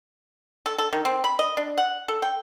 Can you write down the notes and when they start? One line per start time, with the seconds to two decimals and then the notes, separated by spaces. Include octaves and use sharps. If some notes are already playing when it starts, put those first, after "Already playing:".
0.66 A4
0.78 A4
0.93 D#3
1.05 C4
1.24 B5
1.39 D#5
1.57 D4
1.78 F#5
2.08 A4
2.22 G5